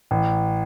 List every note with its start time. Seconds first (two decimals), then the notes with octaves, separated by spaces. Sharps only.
0.11 A1